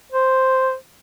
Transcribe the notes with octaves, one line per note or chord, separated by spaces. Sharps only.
C5